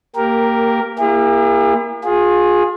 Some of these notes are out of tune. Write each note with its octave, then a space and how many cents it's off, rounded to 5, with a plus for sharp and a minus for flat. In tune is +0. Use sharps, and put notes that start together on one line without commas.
A#3 -15 G4 +0 A#4 +0
A#3 +15 E4 +20 G#4 -45
F4 +30 G#4 +0